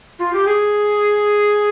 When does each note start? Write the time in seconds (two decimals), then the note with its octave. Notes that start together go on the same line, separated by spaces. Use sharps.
0.19 F4
0.33 G4
0.45 G#4